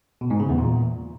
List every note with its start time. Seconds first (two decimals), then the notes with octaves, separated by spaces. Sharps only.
0.21 B2
0.30 G#2
0.40 C#3
0.49 E2
0.58 A#2